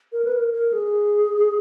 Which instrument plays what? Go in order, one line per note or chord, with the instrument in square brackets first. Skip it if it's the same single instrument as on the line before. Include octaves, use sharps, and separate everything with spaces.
[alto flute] A#4
B4
A#4
A#4
G#4